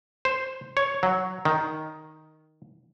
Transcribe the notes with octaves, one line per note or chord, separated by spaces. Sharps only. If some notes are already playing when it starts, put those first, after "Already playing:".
C5
C#5
F#3
D#3